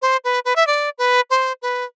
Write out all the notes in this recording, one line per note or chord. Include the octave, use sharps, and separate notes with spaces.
C5
B4
B4
E5
D5
B4
C5
B4